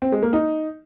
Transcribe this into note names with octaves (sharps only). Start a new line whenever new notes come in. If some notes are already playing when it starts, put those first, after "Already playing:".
C4
G#3
A#3
D#4